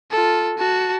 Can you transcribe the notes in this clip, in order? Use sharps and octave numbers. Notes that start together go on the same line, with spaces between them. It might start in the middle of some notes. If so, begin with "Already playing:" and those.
F4 A4
F#4 A5